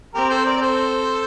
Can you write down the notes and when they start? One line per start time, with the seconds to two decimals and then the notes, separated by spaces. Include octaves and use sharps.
0.15 C4 G4 A#4
0.30 A4 C5
0.45 A#4 D5
0.57 D5
0.61 A4 C5